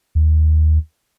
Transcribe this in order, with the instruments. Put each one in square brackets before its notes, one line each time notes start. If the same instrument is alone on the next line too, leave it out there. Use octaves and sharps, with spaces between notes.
[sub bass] D#2